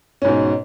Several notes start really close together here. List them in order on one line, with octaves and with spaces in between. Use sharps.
C#4 G#2 B2